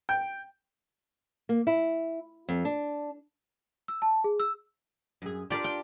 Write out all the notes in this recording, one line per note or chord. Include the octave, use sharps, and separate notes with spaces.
G5
A#3
E4
F2
D4
E6
A5
G#4
E6
F#2 G#4
D4 F4 G4 A#4 D5
G5